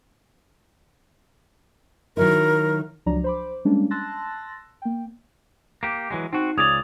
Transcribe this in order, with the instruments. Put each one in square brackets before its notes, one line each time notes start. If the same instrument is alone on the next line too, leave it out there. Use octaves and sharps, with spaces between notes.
[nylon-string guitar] D#3 F#3 E4 [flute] A#4
[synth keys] C#2 F3 F#3 D4 D5 A#5
C5 B5 D6
G3 G#3 A#3 C#4 D4
A5 C6 E6 F#6 A6 A#6
A#3 G5
[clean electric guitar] A#3 G4
E3 F#3 G#3
[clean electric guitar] C4 F#4 [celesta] D#4
[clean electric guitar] C#2 C#3 D5 [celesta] D#6 G#6 F7